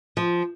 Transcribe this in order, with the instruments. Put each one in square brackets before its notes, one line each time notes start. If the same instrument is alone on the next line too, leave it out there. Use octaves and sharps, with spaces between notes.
[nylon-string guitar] F3